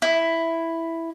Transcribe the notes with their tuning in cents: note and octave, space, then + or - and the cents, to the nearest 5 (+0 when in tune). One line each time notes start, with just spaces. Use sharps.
E4 +0